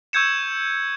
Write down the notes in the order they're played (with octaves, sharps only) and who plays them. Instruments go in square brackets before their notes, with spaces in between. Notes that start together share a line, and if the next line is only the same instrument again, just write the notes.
[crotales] C#6 E6 G6 G#6 C#7 E7